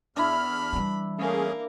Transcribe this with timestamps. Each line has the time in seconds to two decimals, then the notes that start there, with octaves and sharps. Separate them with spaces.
0.16 E2 D4 E4 B5 F6
0.73 E3 G3
1.19 A3 A#3 C#4 G#4